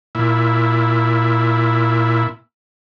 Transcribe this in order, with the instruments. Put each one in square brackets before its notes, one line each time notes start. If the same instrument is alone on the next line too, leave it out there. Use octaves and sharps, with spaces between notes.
[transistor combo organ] A#2 E4